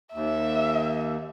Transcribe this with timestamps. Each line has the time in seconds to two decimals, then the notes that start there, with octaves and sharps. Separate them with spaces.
0.14 D#2 E5